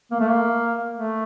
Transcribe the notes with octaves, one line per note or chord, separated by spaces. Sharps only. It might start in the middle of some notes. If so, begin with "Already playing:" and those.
A#3
A3
A#3
A3